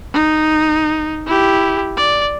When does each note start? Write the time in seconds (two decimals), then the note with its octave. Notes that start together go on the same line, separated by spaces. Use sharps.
0.14 D#4
1.26 E4 G4
1.97 D5